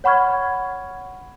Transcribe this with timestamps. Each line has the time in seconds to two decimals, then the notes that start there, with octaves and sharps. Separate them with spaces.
0.04 C#5 F#5 B5 C#6 F6 G#6